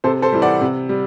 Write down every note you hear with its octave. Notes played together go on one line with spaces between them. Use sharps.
C3 A4 C5
A4 C5
E3 G3
D5 F#5
C3
G3